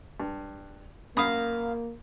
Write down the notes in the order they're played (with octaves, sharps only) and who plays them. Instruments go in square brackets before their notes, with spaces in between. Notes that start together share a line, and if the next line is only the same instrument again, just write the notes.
[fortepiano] G2
[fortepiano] F#2 B5 D#6 [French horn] A#3 [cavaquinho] F5 A#5